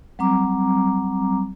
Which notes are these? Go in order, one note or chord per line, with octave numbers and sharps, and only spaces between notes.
F#3 G3 C4 A#5 D6